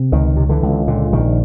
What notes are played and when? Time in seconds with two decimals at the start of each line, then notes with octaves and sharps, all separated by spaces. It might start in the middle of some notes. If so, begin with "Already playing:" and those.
Already playing: C3
0.12 C#2 D#3
0.37 C3
0.49 D3 E3
0.63 C#2
0.87 A#2 D3
1.12 A#1 D#3